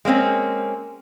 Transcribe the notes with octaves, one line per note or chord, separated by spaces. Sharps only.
G#3 A#3 C4 C#4